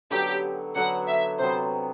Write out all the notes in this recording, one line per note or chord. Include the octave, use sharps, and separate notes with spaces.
D3 F#3 B3 G4
D3 F#3 B3 F#5
E5
C3 F#3 B3 C5